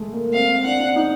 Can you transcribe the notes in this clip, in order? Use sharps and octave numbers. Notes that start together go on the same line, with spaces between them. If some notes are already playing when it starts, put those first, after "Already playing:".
Already playing: G#3 A3
A#3
C4 F5
D4 F#5
D4
D#4